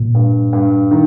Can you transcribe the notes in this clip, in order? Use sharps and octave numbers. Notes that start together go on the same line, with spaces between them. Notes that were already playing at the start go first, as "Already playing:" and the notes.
Already playing: A#2
G2
G2
D#3